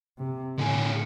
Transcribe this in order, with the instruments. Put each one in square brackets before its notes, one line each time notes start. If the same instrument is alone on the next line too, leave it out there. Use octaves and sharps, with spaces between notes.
[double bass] C3
[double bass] A2 [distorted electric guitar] D3 G#4